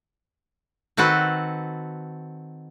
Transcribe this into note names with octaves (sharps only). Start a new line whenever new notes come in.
D#3 C4 F#4 A4 B4